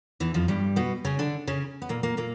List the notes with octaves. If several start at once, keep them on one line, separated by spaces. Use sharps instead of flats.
E2 E3
F2 F3
G2 G3
B2 B3
C#3 C#4
D3 D4
C#3 C#4
B3
A#2 A#3
A#2 A#3
A#2 A#3